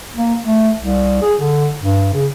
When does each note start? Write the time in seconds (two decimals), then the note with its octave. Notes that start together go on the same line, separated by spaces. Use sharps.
0.15 A#3
0.44 A3
0.81 C2
1.22 G#4
1.40 D3
1.82 G2
2.14 C#3